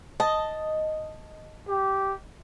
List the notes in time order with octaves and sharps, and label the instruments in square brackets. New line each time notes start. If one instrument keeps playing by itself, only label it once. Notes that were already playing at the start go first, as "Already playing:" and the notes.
[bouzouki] D#5 [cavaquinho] A5
[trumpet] G4